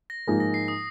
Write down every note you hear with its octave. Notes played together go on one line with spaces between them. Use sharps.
A#6
G#2 F3 A#3 D#4 G#4
A#6
C7
D#6